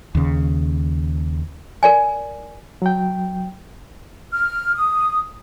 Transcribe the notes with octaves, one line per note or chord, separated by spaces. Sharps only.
D#2 C#3
A#4 D5 G#5
F#3 G5
F6
D#6